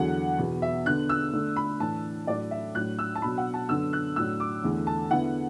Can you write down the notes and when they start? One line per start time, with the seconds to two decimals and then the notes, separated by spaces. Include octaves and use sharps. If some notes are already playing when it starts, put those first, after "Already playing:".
Already playing: E2 D3 F#3 F#5
0.38 E2 B2 B3
0.62 E5
0.85 D3 B3 D4 F#6
1.09 E6
1.33 D3 A3 D4
1.56 B5
1.80 A2 E3 D4 A5
2.27 A2 F#3 A3 D4 D5
2.51 E5
2.75 A2 F#3 D4 F#6
2.99 E6
3.15 A5
3.22 B2 F#3 D4 B5
3.38 F#5
3.54 A5
3.69 F#2 D3 B3 D4 E6
3.93 F#6
4.16 A2 F#3 D4 E6
4.40 D6
4.64 E2 D3 A3 E4
4.87 A5
5.11 D3 B3 E4 F#5